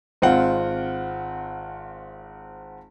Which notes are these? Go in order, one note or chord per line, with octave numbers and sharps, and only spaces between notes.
G#1 C4 F4 F#5